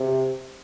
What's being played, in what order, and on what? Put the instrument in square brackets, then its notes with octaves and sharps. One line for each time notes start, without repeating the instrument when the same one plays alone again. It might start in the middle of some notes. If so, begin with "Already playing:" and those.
Already playing: [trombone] C3